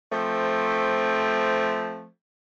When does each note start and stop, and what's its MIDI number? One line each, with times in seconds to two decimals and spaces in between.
0.11 2.05 53
0.11 2.05 57
0.11 2.05 60